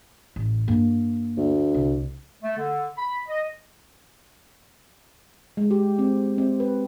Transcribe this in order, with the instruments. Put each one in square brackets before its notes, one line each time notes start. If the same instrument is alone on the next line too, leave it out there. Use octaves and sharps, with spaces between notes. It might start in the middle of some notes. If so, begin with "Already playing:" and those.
[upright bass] A1
G2 A#3
[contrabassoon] D2
[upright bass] C2
[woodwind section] A3
D3
B5
D#5
[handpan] G#3
G4
C4
C4
B4